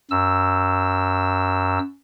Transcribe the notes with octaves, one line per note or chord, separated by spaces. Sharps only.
F#2 E6